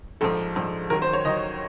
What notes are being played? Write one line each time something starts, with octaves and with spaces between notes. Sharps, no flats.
A#1 G#2 F3 A4
A#1 G#2 F3
D#2 D#3 F#3 A#4
C5
C#5
D#2 D#3 F#3 D#5